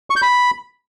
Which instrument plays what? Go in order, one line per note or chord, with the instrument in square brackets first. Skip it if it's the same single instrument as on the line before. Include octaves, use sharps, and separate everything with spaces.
[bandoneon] C#6
G6
B5